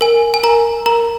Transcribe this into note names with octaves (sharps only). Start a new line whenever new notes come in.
A#4 G#5
G#5
A#4 A#5
A#4 A#5